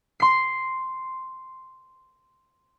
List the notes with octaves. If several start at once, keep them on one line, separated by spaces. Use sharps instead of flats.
C6 C7